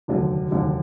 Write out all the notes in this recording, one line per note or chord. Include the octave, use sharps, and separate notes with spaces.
F1 D#2 D3 F#3
F1 D#2 D3 F#3